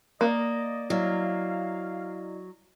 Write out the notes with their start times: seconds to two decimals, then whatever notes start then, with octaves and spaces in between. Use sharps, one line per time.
0.21 A#3 D5 D#5
0.90 F#3 E4 D5 D#5 F5